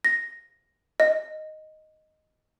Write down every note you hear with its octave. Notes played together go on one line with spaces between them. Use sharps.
A#6
D#5